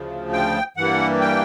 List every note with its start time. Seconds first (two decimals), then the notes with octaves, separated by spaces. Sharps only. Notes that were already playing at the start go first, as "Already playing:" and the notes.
Already playing: D2 C#3 F3
0.33 G5
0.77 G2 E3 G3 A#3 F#5
1.21 G5